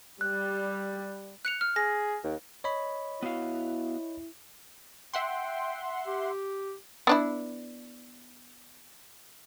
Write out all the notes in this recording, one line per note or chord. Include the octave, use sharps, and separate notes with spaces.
G3 F#6
F#6 C#7 F7
F6
G#4 A#6
D#2
C#5 D#5 B5
B3 E4 F#4 F5
E5 F#5 G5 C6
G4
B3 D4 E4